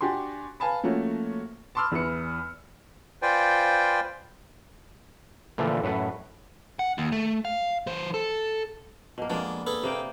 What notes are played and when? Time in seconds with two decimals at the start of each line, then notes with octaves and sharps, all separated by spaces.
0.01 D4 F#4 G4 G#5 C6
0.60 B4 F5 G#5 A5 B5
0.83 F3 A3 A#3 C#4 F#4
1.75 A5 B5 C6 D6 E6 F6
1.91 E2 E3 E4 B4 C#7
3.22 F4 B4 C5 D5 G5 G#5
5.58 A#2 D3 E3 F3 A3
5.83 F#2 A2 B4 F#5
6.79 F#5
6.98 D#2
7.12 A3
7.45 F5
7.87 E3 C5
8.14 A4
9.18 B2 A#3
9.30 F2 G#3 A#3 B3 D4
9.67 G#4 A4 B4
9.83 C3 A#3 G5